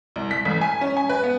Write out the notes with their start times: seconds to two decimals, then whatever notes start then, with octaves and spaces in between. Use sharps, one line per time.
0.16 C2
0.31 B6
0.45 A1
0.61 G#5
0.81 C#4
0.97 G#5
1.09 B4
1.24 B3